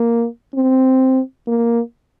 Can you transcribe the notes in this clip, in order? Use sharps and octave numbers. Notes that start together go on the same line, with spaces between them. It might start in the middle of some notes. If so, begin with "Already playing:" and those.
Already playing: A#3
C4
A#3